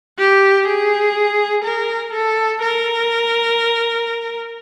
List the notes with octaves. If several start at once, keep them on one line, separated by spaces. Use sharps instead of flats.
G4
G#4
A#4
A4
A#4